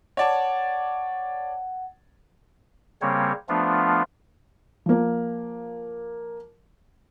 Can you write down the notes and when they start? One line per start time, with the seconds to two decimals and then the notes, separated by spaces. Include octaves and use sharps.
0.17 C#5 D5 F#5 A5
3.02 C#3 G3 A#3 C4 C#5
3.49 F3 A3 B3 D4 F4
4.86 F3 A#3